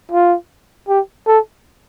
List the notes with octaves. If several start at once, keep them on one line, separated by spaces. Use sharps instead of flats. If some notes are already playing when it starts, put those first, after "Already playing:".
F4
G4
A4